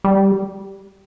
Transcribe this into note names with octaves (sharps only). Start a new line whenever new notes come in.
G3